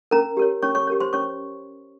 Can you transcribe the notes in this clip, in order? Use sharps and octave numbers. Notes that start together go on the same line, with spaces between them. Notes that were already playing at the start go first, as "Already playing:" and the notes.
C#4 A#4 A#5
G4 A#4 C#5
C#4 C#5 C#6
C#5 C#6
G4 A#4 C#5
C5 C6
C#4 C#5 C#6